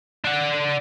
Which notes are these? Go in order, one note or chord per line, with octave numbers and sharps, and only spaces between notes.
D4 F#5